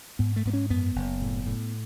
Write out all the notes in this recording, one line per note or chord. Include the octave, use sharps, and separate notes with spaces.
G#2 B3
A3
G#2 B3
C#4
F#2 B3
F#1
A2
A2